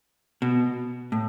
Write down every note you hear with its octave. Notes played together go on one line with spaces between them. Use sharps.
B2
A2